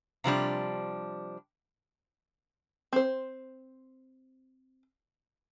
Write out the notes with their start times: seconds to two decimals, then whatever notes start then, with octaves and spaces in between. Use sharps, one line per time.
0.24 C3 F3 G3 D4
2.93 C4 C5